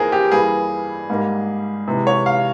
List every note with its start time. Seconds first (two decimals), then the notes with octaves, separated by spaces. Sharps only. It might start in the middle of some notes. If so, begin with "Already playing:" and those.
Already playing: F2 E3 A#3 G#4 A#4 C5
0.12 G4
0.31 G2 E3 G3 A#3 G#4
1.10 G#2 G3 A#3
1.88 C3 E3 G#3
2.07 C#5
2.26 F5